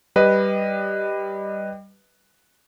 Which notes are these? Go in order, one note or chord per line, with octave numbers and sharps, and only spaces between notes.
G3 B4 D#5